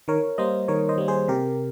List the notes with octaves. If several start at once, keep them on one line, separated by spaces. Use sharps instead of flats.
D#3 A#4 C#5
G3 A#3 C5 D#5
D#3 A#4 C#5
C5 D#5
G3 A#3
G#4 C5
C3 G4 A#4